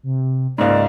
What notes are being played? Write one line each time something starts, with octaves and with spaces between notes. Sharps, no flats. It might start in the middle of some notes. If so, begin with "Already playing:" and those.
C3
C#2 G#2 A#3 D5